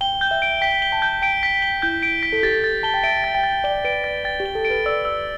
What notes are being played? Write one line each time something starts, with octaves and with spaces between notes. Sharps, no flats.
G5 G7
G6
E5
D7
G5 B6
G7
A5
G6
G5 D7
B6
G7
E4 G6
D7
B6
A4
G4 A6
A6
A5 G7
G5
E5 D7
A6
G5
A6
D5 G7
B4 D7
D5 A6
G5 A6
G4
G7
A4
D7
B4
D5 E6
E6